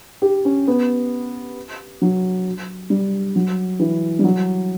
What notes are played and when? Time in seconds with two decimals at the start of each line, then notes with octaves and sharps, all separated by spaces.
0.22 G4
0.45 C#4
0.68 B3
2.02 F#3
2.90 G3
3.36 F#3
3.80 E3
4.19 G3
4.24 F#3